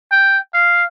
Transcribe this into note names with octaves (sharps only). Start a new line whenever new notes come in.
G5
F5